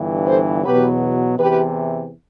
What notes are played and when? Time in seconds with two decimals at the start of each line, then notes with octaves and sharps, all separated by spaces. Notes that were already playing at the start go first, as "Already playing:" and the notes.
Already playing: G1 G2 E3
0.27 A4 C5
0.64 E2 B2 F#3 G4 B4
1.38 E2 C3 E3 G4 B4